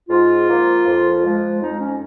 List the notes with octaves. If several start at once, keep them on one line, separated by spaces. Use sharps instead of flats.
G#2 F4
F3 A#3
F2
F3 G#3
F2 D#4
C#4